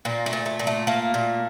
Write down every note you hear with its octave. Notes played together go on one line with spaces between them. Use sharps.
A#2 A#3
A3
A#2
A3
A#2
A3
A3 A#3
A#2